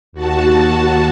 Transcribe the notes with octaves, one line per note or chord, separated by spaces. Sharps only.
D#2 F#4 A5